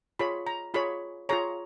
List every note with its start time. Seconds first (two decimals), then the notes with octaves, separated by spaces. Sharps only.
0.19 F4 G#4 C#5 B5
0.47 A#5
0.74 F4 G#4 C#5 B5
1.29 F4 G#4 C#5 A#5